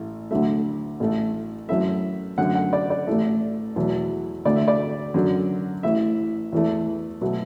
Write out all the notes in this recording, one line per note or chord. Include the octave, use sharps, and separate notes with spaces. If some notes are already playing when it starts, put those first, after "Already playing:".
Already playing: A1 A2 A3
D2 D3 F#3 A3 E5
A1 A2 A3
F#2 E3 A3 E5
F#2 D3 A3 F#5
F#5
D5
D5
A1 A2 E3 A3
E2 B2 F#3 A3
D2 D3 A3 D5
E5
D5
F#2 D3 F#3
A1 A2 E3 E5
E2 E3 A3
B2 F#3 A3